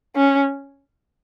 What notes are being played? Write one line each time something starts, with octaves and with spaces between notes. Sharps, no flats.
C#4